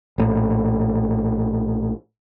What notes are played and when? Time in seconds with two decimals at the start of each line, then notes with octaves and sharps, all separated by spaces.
0.18 A#1 A2